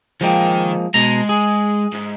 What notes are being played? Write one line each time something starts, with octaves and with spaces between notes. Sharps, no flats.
D#3 F3 G#3 A#3 G5
B2 G#3 A#5
G#4
G#2